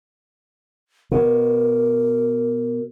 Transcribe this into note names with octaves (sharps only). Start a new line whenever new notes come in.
B2 A#4